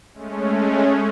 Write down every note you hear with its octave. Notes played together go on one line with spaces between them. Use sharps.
G#3 A3 C#4